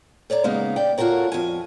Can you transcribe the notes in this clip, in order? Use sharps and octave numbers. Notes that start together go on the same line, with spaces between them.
A4 C#5 D5 A#5
C#3 G#3 A#3 B3 D#4
D5 G5
F4 F#4 A4 A#4 C#5
F2 G#5